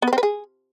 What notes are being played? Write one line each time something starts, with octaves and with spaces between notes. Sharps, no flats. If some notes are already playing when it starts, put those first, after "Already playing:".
B3
B4
C4
B4
G#4